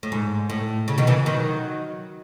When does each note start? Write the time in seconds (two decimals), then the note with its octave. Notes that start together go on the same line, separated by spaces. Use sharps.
0.03 A2
0.12 G#2
0.50 A2
0.88 C#3
0.98 B2 D#3
1.07 C#3 E3
1.26 D#3 F#3